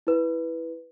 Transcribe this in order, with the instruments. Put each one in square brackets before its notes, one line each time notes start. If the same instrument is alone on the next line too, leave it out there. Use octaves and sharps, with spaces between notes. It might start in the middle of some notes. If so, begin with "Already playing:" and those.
[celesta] E4 B4